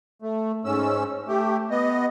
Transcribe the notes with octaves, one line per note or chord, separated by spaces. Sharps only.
A3
G#2 C#4 E6
A3 G4
B3 D#5